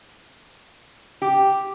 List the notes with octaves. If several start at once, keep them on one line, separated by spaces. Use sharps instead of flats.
G4